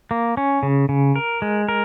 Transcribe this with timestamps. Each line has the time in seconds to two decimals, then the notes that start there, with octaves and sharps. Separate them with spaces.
0.11 A#3
0.37 C#4
0.63 C#3
0.89 C#3
1.16 A#4
1.42 G#3
1.69 A#4